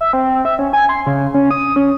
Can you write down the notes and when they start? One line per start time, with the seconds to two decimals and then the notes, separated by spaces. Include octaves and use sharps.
0.01 E5
0.13 C4
0.45 E5
0.59 C#4
0.73 G#5
0.89 C6
1.07 C#3
1.34 C#4
1.51 D#6
1.76 C#4